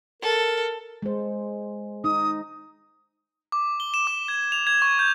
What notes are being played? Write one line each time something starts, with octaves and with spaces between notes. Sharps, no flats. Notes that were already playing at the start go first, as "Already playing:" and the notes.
A4 A#4
G#3 C5
D#4 D#6
D6
G7
E7
D6
G#6
F7
G#6
C#6
G6